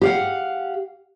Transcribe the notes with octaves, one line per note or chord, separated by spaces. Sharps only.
G4 F5 F#5